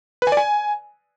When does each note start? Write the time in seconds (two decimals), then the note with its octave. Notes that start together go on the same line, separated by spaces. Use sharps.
0.22 B4
0.27 G#5
0.32 D5
0.37 G#5